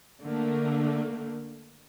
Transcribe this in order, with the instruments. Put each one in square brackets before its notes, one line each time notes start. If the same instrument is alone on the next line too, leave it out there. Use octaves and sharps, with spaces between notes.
[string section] D3 A3 A#3